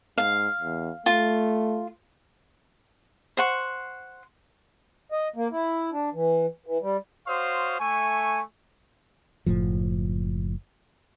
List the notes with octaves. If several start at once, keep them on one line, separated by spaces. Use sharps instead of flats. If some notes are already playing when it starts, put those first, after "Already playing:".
G#2 F5
E2
A3 F4
C5 F#5 C#6
D#5
A#3
E4
D4
E3
E3
G3
F#4 C5 C#5 F5 C6 D#6
A3 G#5 C#6
F#1 A2 F3